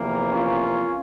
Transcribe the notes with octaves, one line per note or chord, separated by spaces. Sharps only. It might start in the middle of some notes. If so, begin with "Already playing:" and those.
Already playing: E2 C3 F3 A#3
C#4 F4